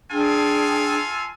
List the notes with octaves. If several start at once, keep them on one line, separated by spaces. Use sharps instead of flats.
D4 F4 G#4 A4 G5 G#5